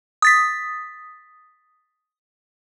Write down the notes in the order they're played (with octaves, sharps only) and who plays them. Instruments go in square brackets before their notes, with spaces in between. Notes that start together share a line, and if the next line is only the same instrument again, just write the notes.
[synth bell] D#6 A6 B6